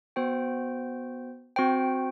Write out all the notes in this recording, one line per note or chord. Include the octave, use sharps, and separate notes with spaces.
B3 F#4 C5 G5
C4 F#4 C5 G5